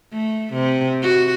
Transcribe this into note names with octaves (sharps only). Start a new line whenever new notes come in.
A3
C3
F#4